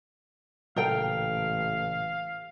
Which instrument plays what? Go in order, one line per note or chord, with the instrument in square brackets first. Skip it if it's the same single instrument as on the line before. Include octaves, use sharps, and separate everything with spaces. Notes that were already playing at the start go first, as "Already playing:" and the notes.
[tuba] A1 [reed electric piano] A#2 C#3 A4 [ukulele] A#4 G5 [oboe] F5